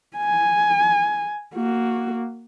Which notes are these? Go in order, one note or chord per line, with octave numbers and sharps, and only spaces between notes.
G#5
A#3 F#4